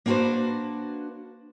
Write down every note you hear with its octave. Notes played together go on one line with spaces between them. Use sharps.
A#3 B3 D4 F#4 B4 C5